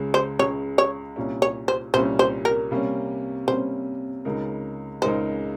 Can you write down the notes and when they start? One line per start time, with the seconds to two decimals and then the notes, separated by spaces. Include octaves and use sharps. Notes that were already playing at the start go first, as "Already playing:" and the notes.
Already playing: C#2 C#3 G#3
0.14 C5
0.39 C#2 C#3 G#3 C#5
0.78 C#5
1.16 C2 A#2 G3 C#4
1.42 C#5
1.68 C5
1.94 C2 A#2 G3 C#4 C5
2.19 C5
2.45 A#4
2.71 C3 G3 A#3 C#4
3.48 C3 G3 A#3 C#4 C5
4.25 C#2 C#3 G#3 D#4 A#4
5.02 C#2 C#3 G#3 D#4 A#4 C5